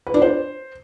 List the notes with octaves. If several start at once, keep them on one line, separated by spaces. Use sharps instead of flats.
B4
D4
C5